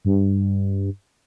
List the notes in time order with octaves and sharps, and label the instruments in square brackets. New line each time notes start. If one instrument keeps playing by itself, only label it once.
[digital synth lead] G2